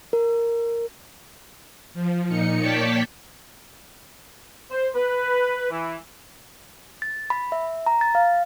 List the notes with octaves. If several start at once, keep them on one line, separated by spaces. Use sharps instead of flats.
A#4
F3
A#2 D#4 C#7
A#3 C#5 D5 G5 A5 B6
C5
B4
E3
A6
B5
E5
A#5
A6
F5